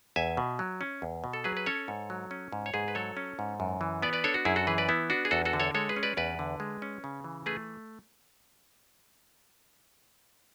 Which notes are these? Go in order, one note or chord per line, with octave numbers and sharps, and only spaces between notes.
E2 E5 G#5
B2
F#3
C#4
E2
B2
A4
F#3 G#4 B4
B4
C#4 A4 C#5
G#2
F#3
C#4
G#2
C#5
G#2 G#4 B4
B4
F#3 A4 C#5
C#4
G#2
F#2
E3
B3 B4 D5
B4 D5
D4 A4 C#5
F#4
F#2 E4 G#4
F#4 A4
E3 G#4 B4
B4 D5
B3 E4
D4 F#4
G#4
E2 F#4 A4
F#4 A4
D3
A4 C#5
G#3 A4 C#5
G#4 B4
C#4
B4 D5
E2 B4 D5
D3
G#3
C#4
C#3
E3
A3 G#4 B4